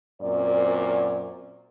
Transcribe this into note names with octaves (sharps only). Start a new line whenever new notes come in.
F#2 A#2 C4 D5